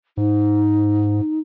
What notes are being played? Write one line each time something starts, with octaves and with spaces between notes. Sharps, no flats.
G#2 D#4